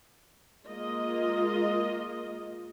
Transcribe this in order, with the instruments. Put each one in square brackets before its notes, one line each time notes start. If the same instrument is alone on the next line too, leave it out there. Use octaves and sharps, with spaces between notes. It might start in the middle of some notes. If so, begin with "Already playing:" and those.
[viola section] G#3 A#3 F4 A#4 D#5